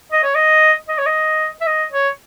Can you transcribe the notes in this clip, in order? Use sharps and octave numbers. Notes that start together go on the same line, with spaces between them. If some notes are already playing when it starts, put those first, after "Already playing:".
D#5
C#5
D#5
D#5
C#5
D#5
E5
D#5
C#5